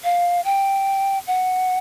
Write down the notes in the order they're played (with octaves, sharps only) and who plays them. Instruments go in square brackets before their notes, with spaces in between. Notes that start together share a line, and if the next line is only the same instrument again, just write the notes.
[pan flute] F5
G5
F#5